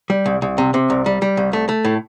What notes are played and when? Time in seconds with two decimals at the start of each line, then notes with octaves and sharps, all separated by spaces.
0.10 G3
0.26 C2
0.42 C2
0.58 C3
0.74 C3
0.90 C2
1.06 G3
1.22 G3
1.37 C2
1.53 A3
1.69 A3
1.85 A2